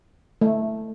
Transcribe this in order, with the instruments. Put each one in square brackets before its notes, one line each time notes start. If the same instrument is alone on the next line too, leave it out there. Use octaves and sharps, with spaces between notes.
[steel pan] A3